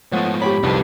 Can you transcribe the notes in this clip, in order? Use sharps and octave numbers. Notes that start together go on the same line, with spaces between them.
G#2 F3 A3 B3 C#5 F#5
G4 C#5 G5 B5
G1 C2 F2 G#2 D4 B4 A5